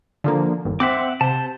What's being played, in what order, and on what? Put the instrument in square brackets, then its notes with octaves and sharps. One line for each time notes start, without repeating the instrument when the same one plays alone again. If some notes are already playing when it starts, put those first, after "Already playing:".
[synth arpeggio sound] D3 F3 A#3
G1 D#2
[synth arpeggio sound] C4 [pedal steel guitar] E5 F#5 D6
[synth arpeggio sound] C3 [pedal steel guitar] C5 A5